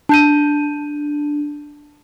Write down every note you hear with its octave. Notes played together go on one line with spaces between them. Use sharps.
D4 A5 G6 D#7